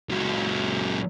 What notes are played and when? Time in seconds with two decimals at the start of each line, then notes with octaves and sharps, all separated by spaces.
0.10 C#2 F#3